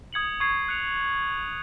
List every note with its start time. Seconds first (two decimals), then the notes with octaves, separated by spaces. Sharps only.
0.13 D#6 G#6 C#7 F#7
0.40 C#6 G#6 C7
0.68 F#6 C#7 F7